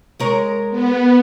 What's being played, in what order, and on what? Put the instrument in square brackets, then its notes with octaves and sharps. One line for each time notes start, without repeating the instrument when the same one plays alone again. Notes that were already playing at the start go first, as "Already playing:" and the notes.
[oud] G#3 A#4 C#5
[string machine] B3